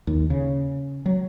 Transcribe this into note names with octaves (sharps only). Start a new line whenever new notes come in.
D#2
C#3
F#3